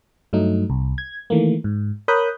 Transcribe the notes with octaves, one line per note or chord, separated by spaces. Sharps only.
G2 F#3 A3 D#4
C2
G#6
D#3 E3 A3 A#3
G#2
A#4 C#5 B5 D#6 F#6 G6